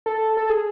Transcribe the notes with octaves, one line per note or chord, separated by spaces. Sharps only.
A4
A4
G#4